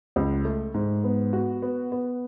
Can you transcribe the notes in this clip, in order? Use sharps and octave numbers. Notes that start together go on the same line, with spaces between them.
C#2
A3
G#2
B3
F#4
B3
B3